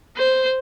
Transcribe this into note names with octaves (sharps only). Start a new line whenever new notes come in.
C5